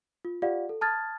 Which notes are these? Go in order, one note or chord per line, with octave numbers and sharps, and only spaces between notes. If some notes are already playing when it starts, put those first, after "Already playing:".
F4
F4 G4 D5 F5 F#5
A4
A5 D#6 F6 G#6 A6